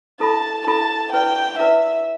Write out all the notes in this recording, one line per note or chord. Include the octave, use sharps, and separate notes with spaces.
E4 A4 E5 A5 B5
E4 A4 E5 A5 B5
E4 B4 D5 G5
E4 B4 D5 E5